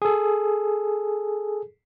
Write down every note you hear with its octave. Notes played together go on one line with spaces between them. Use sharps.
G#4 A4